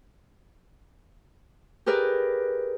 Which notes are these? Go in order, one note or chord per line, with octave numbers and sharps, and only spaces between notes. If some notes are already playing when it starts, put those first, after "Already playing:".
G4 G#4 A#4 B4 D5